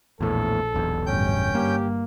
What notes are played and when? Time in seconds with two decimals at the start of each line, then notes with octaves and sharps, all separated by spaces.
0.21 A#1 E2 A2 A4
0.74 E1 B1 E2
1.06 G1 A2 C#4 G5 G6
1.55 G2 A#3 G4